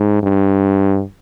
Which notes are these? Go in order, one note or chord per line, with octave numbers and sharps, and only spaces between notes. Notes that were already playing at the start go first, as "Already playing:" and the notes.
Already playing: G#2
G2